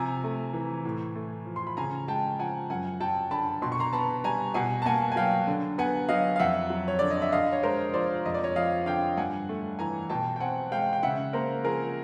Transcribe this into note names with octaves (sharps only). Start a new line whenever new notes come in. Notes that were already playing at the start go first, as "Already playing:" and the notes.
Already playing: C3 F3 G#5 A#5
A3
E3
A2
A3
F3
C6
B5
C#3 G#5 A#5
G#3 G5 A5
F3 F#5 G#5
F#2 F#5 G#5
F#3 G5 A5
D3 A5 B5
B2 C6
C#6
A#5 C6
B3 A5 B5
G3 G#5 A#5
B2 F#5 G#5
A5
A#3 F#5 G#5
G#5
F#3 F5 G5
D3
B3 F#5 G#5
F#3 D#5 F5
F5
F2 E5 F#5
F#3
C#5
D3 D5
D#5
E5
D3 D#5 F5
C#5
G#3 A#4 C5
F3 C5 D5
F2 D#5
D5
C#5 D#5
F3 D#5 F5
D3 F5 G5
G2 F#5 G#5
A3
E3 G#5 A#5
B2 G5 A5
G5
C4 F#5 G#5
G#3 F5 G5
G5
C#3 E5 F#5
A#3 A#4 C5
F3 G#4 A#4